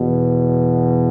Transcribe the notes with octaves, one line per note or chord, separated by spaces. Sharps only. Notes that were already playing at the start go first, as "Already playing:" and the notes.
Already playing: E2 B2